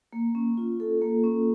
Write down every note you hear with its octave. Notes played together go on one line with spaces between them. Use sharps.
A#3
C#4
F4
A4
A#3
C#4